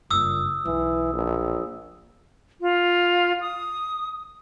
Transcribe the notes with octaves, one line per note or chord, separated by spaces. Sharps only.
F#1 G2 A#2 D#6 E6
B1 E3
A#1
F4
D#6